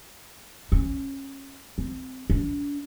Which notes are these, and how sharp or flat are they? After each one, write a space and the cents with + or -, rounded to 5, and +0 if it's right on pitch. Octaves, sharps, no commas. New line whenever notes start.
C#4 -20
C4 -15
D4 -40